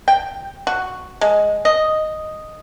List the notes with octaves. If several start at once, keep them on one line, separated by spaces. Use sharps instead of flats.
G5
F#4
G#3
D#5